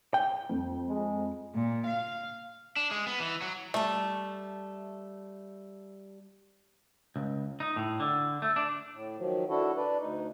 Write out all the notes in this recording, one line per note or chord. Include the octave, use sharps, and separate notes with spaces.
G5
F2
G#3
A#2
F5
D4
G#3
B3
E3
F#3
G3 A3 A5
C#2
D#4
A2
D3
A3
D4
A2
D#3 F3 F#3
D4 E4 F#4 A4
D4 B4 D5
D2 D#4